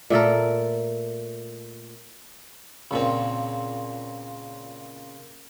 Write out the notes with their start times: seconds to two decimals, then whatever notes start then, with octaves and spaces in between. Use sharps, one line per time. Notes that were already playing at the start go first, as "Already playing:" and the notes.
0.10 A#2 A3 A4 A#4
2.91 C#2 A#2 C4